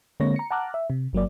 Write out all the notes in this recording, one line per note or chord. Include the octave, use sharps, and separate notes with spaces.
D3 G#3 A#3 C4 C#5 A#6
A#5 C#7
F#5 A5 A#5 D6 F6 F#6
E5
C3
G1 F#3 A#3 D5